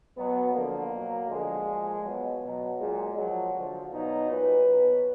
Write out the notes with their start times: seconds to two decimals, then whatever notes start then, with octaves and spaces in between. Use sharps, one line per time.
0.16 B2 F#3 B3
0.53 D3 F3 A#3
0.91 B2 F#3
1.29 D3 F3 G#3
1.67 A#2 F3
2.04 B2 F#3
2.42 B2 F#3
2.80 A#2 F#3 G#3
3.18 A#2 F3 F#3
3.55 D3 F3
3.92 B2 F#3 D#4
4.30 A#2 F#3 B4
4.68 B2 F#3